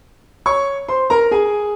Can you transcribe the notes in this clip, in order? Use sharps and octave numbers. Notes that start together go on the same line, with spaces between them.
C#5 C#6
C5 C6
A#4 A#5
G#4 G#5